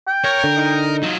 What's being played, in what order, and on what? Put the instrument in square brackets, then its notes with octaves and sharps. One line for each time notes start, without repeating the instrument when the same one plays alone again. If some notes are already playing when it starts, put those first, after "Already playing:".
[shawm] G5
[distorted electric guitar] A#4 [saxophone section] C#5
[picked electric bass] D3
[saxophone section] D#4
[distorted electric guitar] F#3 F4